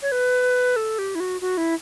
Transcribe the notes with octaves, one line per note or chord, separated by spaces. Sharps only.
C#5
B4
A4
G4
E4
F#4
F#4
E4